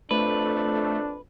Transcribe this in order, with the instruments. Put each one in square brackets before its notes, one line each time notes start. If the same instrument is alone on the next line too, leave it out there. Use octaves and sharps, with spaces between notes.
[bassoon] F2 [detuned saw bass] A3 [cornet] D4 [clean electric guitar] B4